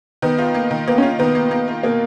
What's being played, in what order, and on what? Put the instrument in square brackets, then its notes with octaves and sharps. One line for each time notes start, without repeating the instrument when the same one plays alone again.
[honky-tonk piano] D#3 [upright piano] B3
[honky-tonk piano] F4
A#3
D#3
[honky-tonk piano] A#3 [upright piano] B3
[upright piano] C#4
[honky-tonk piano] F4
[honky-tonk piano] D#3 [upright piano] B3
[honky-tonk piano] A#3
A#3
F4
[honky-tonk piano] B2 [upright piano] A#3